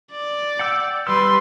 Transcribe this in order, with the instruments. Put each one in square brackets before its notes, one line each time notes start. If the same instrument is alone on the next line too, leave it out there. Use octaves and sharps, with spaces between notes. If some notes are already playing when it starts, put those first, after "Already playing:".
[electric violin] D5
[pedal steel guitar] F#5 G5 E6
[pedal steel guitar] G3 E6 [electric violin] B4 C6